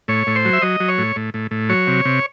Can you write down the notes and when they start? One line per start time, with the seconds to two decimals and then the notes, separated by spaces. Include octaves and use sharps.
0.08 A2 C#5
0.27 A2
0.36 C5
0.45 F#3
0.53 E5
0.62 F#3 D#5
0.80 F#3
0.89 C#5
0.98 A2
1.16 A2
1.34 A2
1.51 A2
1.69 F#3 C#5
1.87 C3
2.05 C3